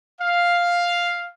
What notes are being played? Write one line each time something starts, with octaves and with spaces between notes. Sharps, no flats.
F5